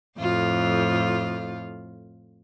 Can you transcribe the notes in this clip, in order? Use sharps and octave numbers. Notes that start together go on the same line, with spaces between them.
F2 A2 F4